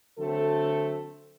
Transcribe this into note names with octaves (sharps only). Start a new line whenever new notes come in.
D3 F#3 A3 C4 A4